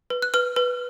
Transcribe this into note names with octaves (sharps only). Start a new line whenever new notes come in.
B4
F#6
B4 F6
B4